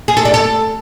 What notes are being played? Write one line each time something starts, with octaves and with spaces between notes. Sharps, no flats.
G#4
A4
D4
A4